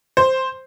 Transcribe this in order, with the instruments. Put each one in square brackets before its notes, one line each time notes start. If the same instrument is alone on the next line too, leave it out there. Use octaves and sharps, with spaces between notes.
[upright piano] C5